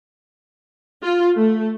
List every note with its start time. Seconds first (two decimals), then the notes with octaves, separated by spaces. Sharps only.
1.03 F4
1.35 A3